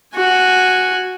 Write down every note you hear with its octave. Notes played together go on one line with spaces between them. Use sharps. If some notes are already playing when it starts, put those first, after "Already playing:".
F#4 G#5